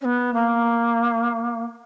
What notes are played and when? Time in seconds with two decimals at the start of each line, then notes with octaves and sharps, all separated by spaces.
0.01 C#4
0.04 B3
0.34 A#3